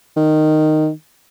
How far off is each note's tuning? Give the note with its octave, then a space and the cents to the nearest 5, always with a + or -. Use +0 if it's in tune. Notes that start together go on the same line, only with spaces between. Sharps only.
D#3 -10